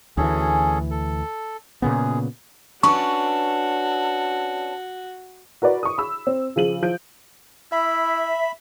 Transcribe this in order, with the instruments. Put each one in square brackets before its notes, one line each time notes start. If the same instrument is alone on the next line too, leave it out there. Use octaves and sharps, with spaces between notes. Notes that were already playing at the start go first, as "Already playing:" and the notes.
[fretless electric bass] D2 E3 [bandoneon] C#4 G#4 A4
[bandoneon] A4
[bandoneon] F#2 G#4 [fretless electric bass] A#2 C#3 B3
[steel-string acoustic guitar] C#4 D4 B4 [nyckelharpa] F#4 [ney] A5 [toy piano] C#6
[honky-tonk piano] F#4 A#4 B4 D5
C#6 D#6
B5 E6
C4
C#3 F3 D#7 F#7
F3 G6 D7
[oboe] E4 [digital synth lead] E5 [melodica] B5